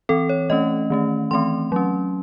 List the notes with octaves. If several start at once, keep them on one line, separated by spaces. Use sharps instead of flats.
E3 C4 A4
C#5
E3 A3 C#4 D#5
D#3 A3 C#4
E3 A3 C4 C6
F#3 C#4